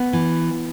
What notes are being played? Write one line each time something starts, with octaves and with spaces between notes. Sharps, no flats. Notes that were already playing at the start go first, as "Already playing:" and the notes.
Already playing: B3
E3